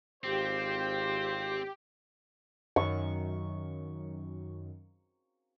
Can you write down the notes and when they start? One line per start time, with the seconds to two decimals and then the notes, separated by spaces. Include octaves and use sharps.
0.24 G#1 C4 F4 G4 C5
2.76 F#2 D#3 C#6